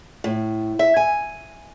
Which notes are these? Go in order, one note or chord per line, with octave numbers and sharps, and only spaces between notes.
A2
E5
G#5